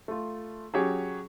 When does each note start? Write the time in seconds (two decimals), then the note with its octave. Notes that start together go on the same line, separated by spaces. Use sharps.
0.08 A3 F4
0.74 F#3 C#4 G4 G#4 C#5